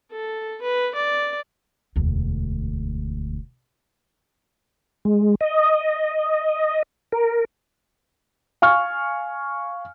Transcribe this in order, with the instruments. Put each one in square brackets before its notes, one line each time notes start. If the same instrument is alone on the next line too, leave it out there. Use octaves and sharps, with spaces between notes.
[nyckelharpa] A4
B4
D5
[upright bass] E1 D2
[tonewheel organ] G#3
D#5
A#4
[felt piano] F5 G#5 C#6 F6